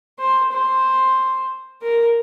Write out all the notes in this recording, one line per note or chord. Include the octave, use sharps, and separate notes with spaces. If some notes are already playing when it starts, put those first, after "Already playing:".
C5
C5
A#4